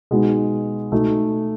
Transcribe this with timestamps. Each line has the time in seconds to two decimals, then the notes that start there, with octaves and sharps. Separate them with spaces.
0.11 B2 G#3 B3 D#4
0.92 B2 A3 D#4